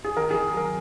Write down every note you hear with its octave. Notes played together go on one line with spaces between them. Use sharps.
G#4
D#3 A#4
D#3 G#4
F#3 A#4